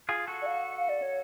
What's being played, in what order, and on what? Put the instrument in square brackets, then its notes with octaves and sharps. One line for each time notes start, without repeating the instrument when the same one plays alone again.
[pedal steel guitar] F4 G#4
F#4 A4
[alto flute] D5
F5
F5
D5
C#5